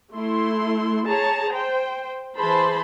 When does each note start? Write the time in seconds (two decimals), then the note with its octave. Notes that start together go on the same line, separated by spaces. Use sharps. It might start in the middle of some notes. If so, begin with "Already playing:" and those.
0.12 A3 E4 C6
1.06 G#4 C#5 A5 A#5
1.51 C5 G5
2.37 E3 G#4 C5 A5 B5 C6